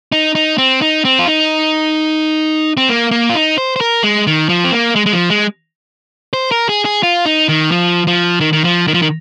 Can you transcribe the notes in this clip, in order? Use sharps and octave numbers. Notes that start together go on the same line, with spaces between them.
D#4
D#4
C4
D#4
C4
F4
D#4
C4
A#3
A#3
F4
D#4
C5
C5
A#4
G#3
D#3
F3
C4
A#3
G#3
G#3
F3
G#3
C5
A#4
G#4
G#4
F4
D#4
D#3
F3
F3
D#3
D#3
F3
D#3
F3
D#3